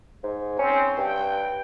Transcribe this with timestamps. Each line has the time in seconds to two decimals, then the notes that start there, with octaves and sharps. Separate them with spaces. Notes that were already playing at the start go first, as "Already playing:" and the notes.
0.23 G#2
0.59 C4 C#4
0.97 G2 G5